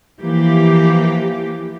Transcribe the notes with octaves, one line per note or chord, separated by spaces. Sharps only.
E3 F3 A#3 G4